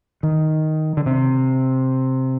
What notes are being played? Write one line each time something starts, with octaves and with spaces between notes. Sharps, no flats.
D#3
D3
C3